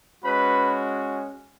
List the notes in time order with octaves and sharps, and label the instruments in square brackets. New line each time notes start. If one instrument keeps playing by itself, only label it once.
[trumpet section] G#3 C#4 F#4 B4 B5